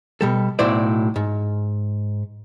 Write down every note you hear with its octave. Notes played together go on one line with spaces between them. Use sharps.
B2 G3 A4
B1 A2 F#3 E4 C5 D5
G#2